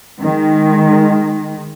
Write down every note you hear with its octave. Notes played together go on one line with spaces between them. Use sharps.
D#3 G#3